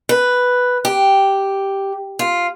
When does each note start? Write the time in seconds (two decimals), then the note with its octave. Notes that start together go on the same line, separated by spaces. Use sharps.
0.09 B4
0.85 G4
2.19 F4